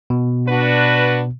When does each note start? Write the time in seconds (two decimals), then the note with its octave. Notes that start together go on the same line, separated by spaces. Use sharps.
0.10 B2
0.48 D4 F#4 B4